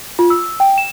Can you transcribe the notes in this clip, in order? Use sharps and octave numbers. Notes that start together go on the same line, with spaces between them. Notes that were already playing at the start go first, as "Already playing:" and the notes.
F4
E6
G5
E7